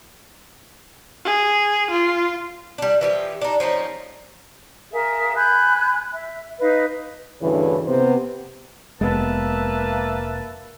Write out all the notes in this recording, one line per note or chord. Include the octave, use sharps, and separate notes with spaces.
G#4
F4
G3 D4
E3 F3 G4
D4 D#4
F3 C4 C#4 D#4
G#4 A#4 E5 F5
G#5 B5 F#6 G6
E5
D#4 B4 D#5 F5
D2 G2 C#3 E3
C3 B3 C5
F1 G#3 A#3 B3 B4 E5 A5